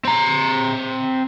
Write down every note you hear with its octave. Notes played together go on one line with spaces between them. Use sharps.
C4 A#5